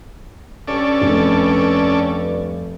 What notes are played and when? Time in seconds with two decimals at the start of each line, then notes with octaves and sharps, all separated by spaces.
0.67 G2 C#4 A4 D5
1.01 F1